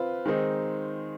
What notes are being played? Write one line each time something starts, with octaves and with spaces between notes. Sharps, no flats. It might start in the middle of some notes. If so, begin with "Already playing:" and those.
Already playing: C4 F4 B4
D#3 G#3 C4 D#4